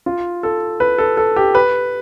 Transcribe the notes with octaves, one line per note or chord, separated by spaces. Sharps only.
F4
A4
B4
A4
A4
G4
B4